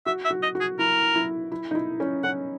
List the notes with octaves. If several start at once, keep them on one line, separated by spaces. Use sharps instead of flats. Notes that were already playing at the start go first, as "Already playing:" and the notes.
F#4 E5
E5
F#4
D#5
F#4
G#4
E4 A#4
E4
E4
D#4
E4
C#4
C#4 F#5